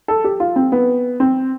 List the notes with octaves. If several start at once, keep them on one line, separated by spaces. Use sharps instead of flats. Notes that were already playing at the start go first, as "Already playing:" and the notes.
A4
G4
F4
C4
B3
C4